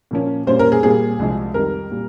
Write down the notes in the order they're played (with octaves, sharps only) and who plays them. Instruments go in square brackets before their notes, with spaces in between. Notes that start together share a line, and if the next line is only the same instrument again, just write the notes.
[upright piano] A#2 F3 A#3 C#4
A#2 G3 A#3 C#4 C5
A#4
G#4
A#2 G3 C4 G#4
C2 C3 F3 G#3
F2 D#3 G3 A#4
A#2 G3